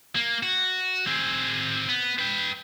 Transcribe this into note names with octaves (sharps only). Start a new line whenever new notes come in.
A#3
F#4
C4 G#4
B3
B4 G5